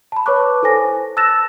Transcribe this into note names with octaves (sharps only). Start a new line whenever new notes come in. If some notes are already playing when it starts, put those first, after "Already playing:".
A5 B5
B4 C#5 A5 C#6 D6 F#6
E4 A4 C5 G#5 A#6
A5 E6 F#6 A6 A#6 E7